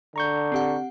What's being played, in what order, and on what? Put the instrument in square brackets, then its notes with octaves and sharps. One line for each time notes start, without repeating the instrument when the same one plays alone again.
[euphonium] D3 [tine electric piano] A#5 C#6 G6
[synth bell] C4 G4 F#5